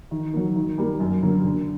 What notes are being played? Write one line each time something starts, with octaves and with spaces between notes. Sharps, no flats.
D#3
F#3 A#3
D#3
G3 A#3
F#2
D3 F#3 A#3
D3